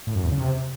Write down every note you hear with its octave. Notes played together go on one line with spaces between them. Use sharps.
A2
F#2
E2
C#3
C3